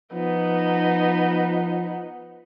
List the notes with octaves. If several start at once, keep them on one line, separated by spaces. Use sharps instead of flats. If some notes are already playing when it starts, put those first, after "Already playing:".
F3 B3 D#4